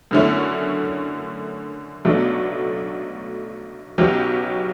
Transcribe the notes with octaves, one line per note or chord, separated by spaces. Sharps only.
F#2 D3 A3 C#4 E4
B1 B2 F#3 A3 D4
B1 B2 F#3 C#4 G4